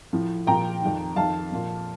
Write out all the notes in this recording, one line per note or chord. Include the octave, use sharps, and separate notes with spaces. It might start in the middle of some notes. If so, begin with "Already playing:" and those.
A2 F3
A#2 F3 G5 A#5
F2 D#3
F2 D#3 F5 A5
A#2 F3